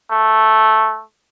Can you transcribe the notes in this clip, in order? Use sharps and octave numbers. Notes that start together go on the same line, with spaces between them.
A3